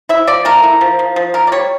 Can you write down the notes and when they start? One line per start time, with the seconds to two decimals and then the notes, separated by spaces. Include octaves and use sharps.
0.09 E4 E5
0.27 F3 D5
0.45 A3 A#4
0.63 E4
0.81 F3
0.99 F3
1.16 F3
1.34 F3 A#4
1.47 D5
1.52 G3 C#5